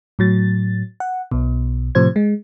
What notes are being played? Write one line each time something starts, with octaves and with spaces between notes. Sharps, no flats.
A2 F#3 A6
F#5
B1 B2
A2 C3 F3 C5 G#6
G#3